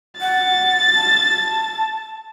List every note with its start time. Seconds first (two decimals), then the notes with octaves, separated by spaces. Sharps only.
0.21 F#5 A6
0.95 A5